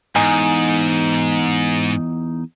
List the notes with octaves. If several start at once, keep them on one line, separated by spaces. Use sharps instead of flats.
E2 G#2 D#4 G#5